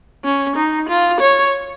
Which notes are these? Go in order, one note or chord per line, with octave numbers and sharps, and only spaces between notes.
C#4
D#4
F4
C#5